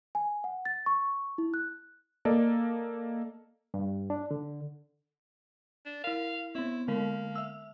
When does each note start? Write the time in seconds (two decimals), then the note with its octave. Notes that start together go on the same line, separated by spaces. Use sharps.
0.15 G#5
0.44 F#5
0.65 A6
0.86 C#6
1.38 E4
1.54 F#6
2.25 A#3 A4 D5 D#5
3.74 G2
4.10 D4
4.31 D3
5.86 D4
6.04 E4 A#4 F5
6.55 B3 C4 E4
6.88 D3 G#3 A#3 A#4
7.35 E5 E6